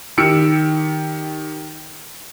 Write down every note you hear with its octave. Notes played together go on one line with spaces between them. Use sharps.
D#3 G4 E6 C#7 D7